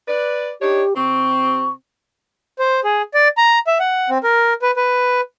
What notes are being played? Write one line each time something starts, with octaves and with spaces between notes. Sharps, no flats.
B4 D5
D4 D#4 G4 C#5
C3 C4 C#6
C5
G#4
D5
A#5
E5
F#5
C4
A#4
B4
B4